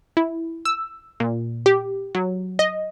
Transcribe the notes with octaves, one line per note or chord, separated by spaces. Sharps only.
E4
E6
A#2
G4
F#3
D#5